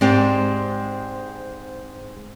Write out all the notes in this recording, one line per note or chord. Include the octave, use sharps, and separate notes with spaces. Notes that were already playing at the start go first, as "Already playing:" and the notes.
G#2 G#3 C4 G4 D5 G5